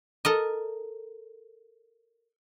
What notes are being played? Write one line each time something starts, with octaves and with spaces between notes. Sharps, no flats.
A4 A#4 D#5